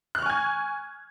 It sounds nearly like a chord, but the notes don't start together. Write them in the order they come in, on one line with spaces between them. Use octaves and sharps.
F#6 F6 C#6 G#5 G#6